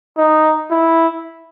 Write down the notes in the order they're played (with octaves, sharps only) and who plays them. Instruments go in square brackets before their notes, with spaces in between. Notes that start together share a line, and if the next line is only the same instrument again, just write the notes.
[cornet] D#4
E4